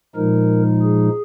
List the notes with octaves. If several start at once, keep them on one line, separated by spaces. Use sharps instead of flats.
A#2 F3 G#3 D#4 A#4
G#4